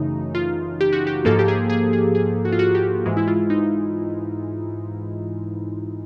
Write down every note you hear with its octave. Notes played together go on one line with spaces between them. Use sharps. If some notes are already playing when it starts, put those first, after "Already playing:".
Already playing: F#2 C#3 E3 A3 D#4
F4
G4
F#4
G4
G#2 F3 A#3 A4
G4
G#4
G#4
G#4
G#4
F#4
F4
F#4
G4
G#2 E3 G#3
E4
F4
D#4